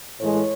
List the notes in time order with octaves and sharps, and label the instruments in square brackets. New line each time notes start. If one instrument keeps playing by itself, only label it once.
[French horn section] A2 E3 G#3 C#5